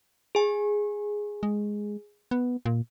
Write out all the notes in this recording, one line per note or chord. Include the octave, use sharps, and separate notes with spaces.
G#4 G#5
G#3
B3
A#2